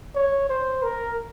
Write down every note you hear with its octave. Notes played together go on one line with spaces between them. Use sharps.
C#5
C5
A#4